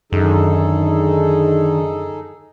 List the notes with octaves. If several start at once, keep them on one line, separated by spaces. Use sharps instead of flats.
F#2 D3 D#3 D#4 G#4 A4